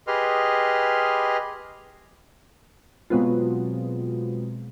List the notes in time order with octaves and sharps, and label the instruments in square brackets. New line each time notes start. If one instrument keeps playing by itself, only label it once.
[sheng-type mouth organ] G4 G#4 B4 D#5 C6 F6
[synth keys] B2 F#3 G#3 B3 C4 F4